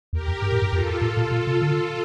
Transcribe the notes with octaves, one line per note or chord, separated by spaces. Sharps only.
E2 G4 A#4
F2
G2
A2
G2
F2 F4 A4
A2
A#2
A#2 F4 A4
C3
D3